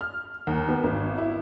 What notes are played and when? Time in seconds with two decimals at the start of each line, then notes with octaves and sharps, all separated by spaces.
0.01 F6
0.47 D#2
0.69 B3
0.84 G#1
1.18 E4